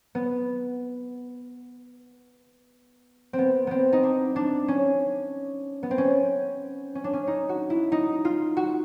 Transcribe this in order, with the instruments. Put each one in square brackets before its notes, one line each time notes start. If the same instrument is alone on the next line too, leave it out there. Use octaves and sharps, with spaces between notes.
[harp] B3
C4
B3
B3 C4
D#4
D4
D4
C#4
B3
C4
C#4
C#4
D4
C#4
D#4
F#4
E4
D#4
F4
F#4